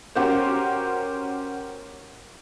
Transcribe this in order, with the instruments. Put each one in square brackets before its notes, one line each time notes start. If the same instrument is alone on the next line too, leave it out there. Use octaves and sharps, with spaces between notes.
[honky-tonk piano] C#4 F#4 G4 A#4 C5